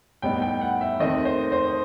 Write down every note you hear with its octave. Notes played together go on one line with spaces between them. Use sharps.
A2 G3 B3 D#4 G5
G5
F#5
E5
D#2 D#3 A3 C4 D#5
C5
C5